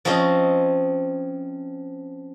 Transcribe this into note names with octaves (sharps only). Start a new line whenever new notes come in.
F3 C4 C#4 D#5